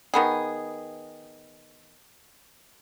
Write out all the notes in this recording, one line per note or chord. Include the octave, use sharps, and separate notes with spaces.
D#3 B3 G#4